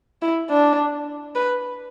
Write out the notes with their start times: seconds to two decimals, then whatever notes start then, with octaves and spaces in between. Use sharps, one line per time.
0.22 E4
0.50 D4
1.35 B4